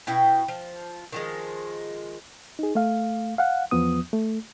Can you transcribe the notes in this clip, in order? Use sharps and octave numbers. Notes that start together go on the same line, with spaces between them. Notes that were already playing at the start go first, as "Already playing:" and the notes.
B2 E4 G5
F3
D#3 F3 G#3
D#4 G#4
A3 F5
F5 F#5
E2 F3 B3 D#6
A3